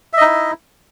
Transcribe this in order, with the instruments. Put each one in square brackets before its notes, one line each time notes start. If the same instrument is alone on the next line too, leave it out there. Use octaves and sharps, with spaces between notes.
[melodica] E5
D#5
D#4
E4